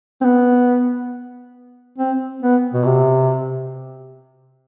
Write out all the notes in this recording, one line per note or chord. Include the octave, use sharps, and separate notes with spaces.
C4
B3
C4
B3
B2
C3